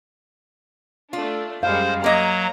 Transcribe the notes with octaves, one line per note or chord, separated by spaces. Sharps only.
A3 D4 F4
F#2 G3 G#3 C5 F5
F#3 A#3 D#5 A#5